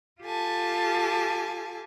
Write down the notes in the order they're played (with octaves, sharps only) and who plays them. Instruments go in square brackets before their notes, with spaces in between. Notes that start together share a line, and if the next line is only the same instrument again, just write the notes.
[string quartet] F4 G4 A4 G#5 A5